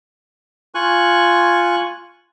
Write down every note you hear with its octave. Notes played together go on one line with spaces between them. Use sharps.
F4 G#5 C#6 F#6